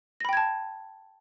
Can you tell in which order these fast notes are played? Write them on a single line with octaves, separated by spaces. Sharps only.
A#6 B5 G5 G#6 A5